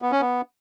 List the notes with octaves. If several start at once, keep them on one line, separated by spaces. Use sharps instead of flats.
B3
C#4
B3